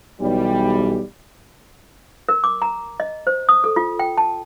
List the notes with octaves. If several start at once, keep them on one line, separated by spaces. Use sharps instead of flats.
B1 E3 G3
A#4
D6
A#5
D#5
C5
D#6
A4
F4
G5
A5